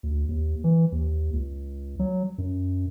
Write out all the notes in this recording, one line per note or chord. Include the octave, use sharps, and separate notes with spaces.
D2
D#2
E3
D#2
C#2
F#3
F#2